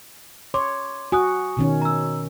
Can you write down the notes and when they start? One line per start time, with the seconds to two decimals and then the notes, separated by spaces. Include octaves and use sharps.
0.54 C#5 C6 D6
1.12 F#4 G#5 D#6 F#6
1.57 B2 D#3 C#4
1.82 A#5 E6